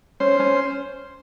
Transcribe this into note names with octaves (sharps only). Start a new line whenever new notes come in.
C#4 C5
C#4